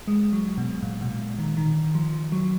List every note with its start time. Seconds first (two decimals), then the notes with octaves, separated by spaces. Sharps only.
0.08 G#3
0.33 F#3
0.58 B2
0.82 A#2
1.01 B2
1.39 D#3
1.57 D#3
1.95 F3
2.32 F#3